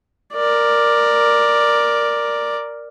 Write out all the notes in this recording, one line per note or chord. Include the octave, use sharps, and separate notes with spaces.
A#4 D5